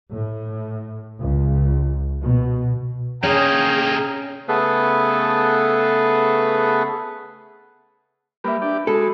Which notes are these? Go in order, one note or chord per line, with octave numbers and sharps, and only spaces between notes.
A2
C#2
B2
C3 A#3 C#4 G#4 G5 A#5
C#3 A3 B3 G#4 A4 B4
G3 A#3 B4 E5
D4 G4 D5
G#3 F#4 A4 B5